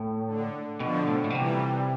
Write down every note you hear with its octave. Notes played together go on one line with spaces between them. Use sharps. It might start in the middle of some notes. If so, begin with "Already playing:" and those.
Already playing: A2
D3
B2 D3 F3
A2
A2
B2
C3 E3 G3